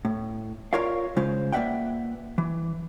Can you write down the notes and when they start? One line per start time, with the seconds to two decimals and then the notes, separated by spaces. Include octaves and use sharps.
0.05 A2
0.73 F4 A#4 C#5 D5 F5
1.16 C#3 G#3 F4 C5
1.52 A#3 B4 D5 E5 F#5 G5
2.38 E3